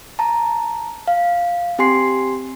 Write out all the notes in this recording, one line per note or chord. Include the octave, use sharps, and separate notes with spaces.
A5 A#5
F5
C4 G4 G#5 C6 C7